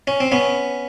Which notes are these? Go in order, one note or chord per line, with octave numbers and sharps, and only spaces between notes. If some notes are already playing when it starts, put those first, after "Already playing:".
C#4
C4
B3 C#4